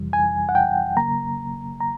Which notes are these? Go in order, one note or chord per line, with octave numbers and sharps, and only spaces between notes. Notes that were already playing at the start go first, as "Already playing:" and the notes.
Already playing: F2 C3 E3 G3
G#5
F#5
G5
C#3 F#3 A#3 A#5
A#5